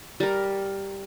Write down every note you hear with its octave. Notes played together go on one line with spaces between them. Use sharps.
G3 A#4